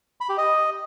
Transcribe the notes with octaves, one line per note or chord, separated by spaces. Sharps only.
B5
G4
D#5